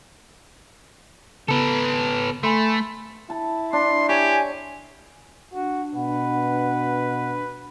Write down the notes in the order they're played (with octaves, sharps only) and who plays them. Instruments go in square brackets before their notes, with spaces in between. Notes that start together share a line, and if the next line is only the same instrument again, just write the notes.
[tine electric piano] C#3 B3 [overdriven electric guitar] A4 B4
[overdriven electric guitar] A3 [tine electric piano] G#5 B5 C6
[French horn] E4 [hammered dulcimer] A5
[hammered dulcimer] D4 [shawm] C6
[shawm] G4 [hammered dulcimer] C#5 [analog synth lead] G#5
[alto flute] D4 [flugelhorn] F#4
[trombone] B2 [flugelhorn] B4 [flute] F#5